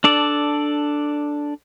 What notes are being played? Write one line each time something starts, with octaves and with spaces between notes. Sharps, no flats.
D4 A4 D5